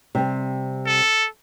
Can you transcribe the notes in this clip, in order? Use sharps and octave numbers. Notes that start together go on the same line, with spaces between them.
C3 G3 C4
A4